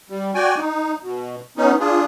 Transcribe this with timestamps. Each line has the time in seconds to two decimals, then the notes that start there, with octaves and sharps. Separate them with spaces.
0.10 G3
0.35 F#4 D5 G5 G#5
0.57 D#4
1.03 B2
1.57 B3 C#4 D#4
1.80 D4 F4 G#4